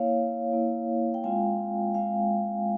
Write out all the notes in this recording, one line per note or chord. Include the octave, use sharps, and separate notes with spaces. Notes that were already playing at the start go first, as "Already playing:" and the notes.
Already playing: A#3 E4 C#5 F5
A#3 E4
G5
G#3 C4 F4 F5 G#5
G#3 C4 F4 F5 G#5